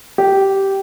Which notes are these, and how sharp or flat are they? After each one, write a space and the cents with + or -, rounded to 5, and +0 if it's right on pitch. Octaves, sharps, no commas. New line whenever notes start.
G4 -10